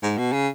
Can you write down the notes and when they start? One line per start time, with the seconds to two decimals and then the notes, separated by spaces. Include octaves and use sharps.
0.03 G#2
0.18 B2
0.32 C#3